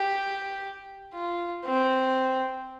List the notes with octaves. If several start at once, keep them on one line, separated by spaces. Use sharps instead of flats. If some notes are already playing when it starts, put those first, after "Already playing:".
Already playing: G4
F4
C4